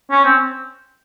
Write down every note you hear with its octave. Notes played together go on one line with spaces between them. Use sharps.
C#4
C4